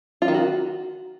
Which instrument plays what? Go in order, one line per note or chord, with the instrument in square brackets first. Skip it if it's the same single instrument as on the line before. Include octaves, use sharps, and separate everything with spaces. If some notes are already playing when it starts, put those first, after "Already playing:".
[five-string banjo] F4
D#3
F#4